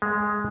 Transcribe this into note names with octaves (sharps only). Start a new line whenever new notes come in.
G#3